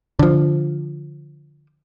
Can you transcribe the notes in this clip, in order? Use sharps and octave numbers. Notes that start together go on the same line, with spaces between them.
D3 F3